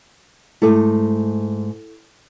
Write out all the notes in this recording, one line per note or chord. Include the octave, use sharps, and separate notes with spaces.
G#2 A3 E4 A4